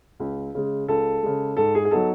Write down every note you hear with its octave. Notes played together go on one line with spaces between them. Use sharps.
C#2
C#3 G#3
C#2 A4
C#3 G#3
G#2 A4
G#4
G#4
F#3 B3 D#4 A4